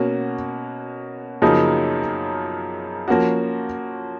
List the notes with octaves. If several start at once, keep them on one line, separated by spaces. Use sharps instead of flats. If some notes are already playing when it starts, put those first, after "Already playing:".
Already playing: B2 A#3 C#4 F#4
F#2 C#3 F3 A#3 D#4
F3 A#3 C#4 F#4